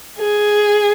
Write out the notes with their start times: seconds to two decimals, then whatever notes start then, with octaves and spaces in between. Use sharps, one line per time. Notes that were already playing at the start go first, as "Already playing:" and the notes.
0.18 G#4